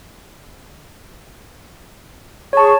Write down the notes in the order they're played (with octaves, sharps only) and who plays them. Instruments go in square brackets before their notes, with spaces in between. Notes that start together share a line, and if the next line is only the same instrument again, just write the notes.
[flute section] G#4 C#6 [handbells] C#5 A5